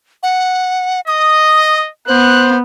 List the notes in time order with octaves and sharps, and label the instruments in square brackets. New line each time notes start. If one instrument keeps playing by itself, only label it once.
[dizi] F#5
[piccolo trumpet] D#5 [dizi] D#6
[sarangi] B3 [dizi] C5 [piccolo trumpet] F#6